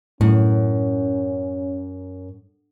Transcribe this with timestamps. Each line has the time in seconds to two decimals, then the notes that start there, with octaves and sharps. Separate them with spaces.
0.21 F#2 A2 C#4